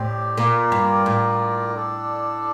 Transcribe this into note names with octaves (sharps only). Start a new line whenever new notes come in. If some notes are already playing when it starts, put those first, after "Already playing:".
Already playing: A2 C4 G4 D5
A#2 A#3 F4 A#4 D5
G2
A2
D4 A4 D5